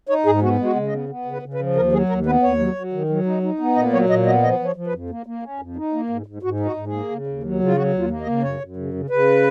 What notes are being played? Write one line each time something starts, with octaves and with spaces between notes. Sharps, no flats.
D#4 C#5
G#2 G#4
B3 F#4
G#3
F#4
C#3
D#5
B3
B3
C#3
B4
C#3
B4
F3
D#2 A#4
F#3 G#4
D#2 A#4
B3 B4
D#2 C#5
F#3
F#3
D#3
F#3
D#4
D#4
B3
A#2 D#5
F#3 C#5
A#2 D#5
B3 D#5
F3 D#5
F3
C#5
F3
B4
F2
A#3
A#3
C#4
F2
D#4
A#3
G#2
G#2
G#2 F#4
D#4
F#4
G#2
G#4
A#3
C#3
D#2
F#3
C#3 F4
F#3 F#4
D#2
F4
A#3
D#5
C#3
F#2 C#5
F#2
C#3
C#3
C#3 B4